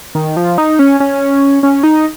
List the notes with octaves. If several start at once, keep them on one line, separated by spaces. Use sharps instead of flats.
D#3
F3
D#4
C#4
C#4
C#4
D#4